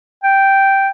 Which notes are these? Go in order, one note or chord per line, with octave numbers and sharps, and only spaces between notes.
G5